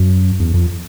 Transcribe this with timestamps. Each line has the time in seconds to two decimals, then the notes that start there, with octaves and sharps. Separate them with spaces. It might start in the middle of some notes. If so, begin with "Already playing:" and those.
Already playing: F#2
0.40 E2
0.54 F2